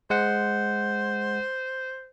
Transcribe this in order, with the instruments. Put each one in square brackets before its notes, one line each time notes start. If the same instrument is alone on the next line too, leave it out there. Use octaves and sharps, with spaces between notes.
[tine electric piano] G#3 F#5 [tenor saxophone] C5